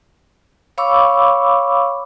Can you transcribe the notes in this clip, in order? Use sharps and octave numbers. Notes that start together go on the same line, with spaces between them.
C#5 F5 B5 C#6 D6 E6